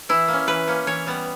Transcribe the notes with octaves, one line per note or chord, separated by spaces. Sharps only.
E3 E4
A#3 C#4
E3 B4
A#3 C#4
E3 C#5
G3 B3